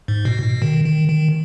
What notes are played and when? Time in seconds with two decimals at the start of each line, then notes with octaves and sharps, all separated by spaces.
0.08 G#2
0.25 B2
0.43 B2
0.62 D#3
0.85 D#3
1.09 D#3